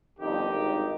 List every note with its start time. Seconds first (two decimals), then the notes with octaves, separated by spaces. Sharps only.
0.19 G1 F2 D#3 D#4 G4
0.51 G#1 G2 D#3